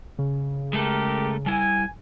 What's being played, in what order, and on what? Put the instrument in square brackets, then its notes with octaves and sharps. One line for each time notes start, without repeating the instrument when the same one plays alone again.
[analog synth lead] C#3
[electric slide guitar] G#3 A3 A4 [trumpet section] G4 A#4
[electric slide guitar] G3 E4 [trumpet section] G#5